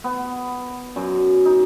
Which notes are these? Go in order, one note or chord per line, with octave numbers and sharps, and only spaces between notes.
B3
F#2
D#4